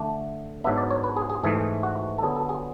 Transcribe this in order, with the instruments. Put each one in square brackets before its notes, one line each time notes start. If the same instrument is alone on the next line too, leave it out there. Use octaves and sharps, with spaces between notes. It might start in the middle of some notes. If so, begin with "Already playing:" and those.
Already playing: [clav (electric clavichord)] D3 A3 D4
G#2 F#3 B3 D4 E5
D5
C#5
B4
G#4
G#4
G#2 E3 A3 G#4
F#4
A4
D3 F#3 B3 G#4
A4
G#4